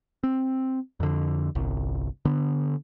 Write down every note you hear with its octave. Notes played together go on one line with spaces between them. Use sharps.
C4
F2 D3
G1 C2
D3 B3